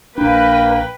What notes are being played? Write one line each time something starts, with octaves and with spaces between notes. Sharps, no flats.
A#1 A#3 D4 B4 G5